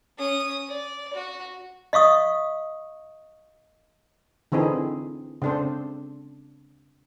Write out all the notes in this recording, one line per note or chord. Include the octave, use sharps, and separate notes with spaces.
C#4 D#6
D5
F#4
D#5 F5 C#6 D#6
D3 E3 C4 D#4 G#4
C#3 C4 D4 A4 C5